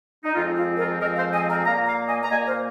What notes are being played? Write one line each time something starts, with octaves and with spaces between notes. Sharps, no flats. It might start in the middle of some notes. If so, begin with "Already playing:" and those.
D#4
F2 F3 G#3 C4 F4
F4
F4 A#4
F2 F3 G#3 C4 A#4 D#5
C5 F5
D#5 G#5
F5 A#5
A#2 A#3 F5 A#5
F5 A#5
D#5 G#5
A#5
A#2 A#3 D#5 G#5
C5 F5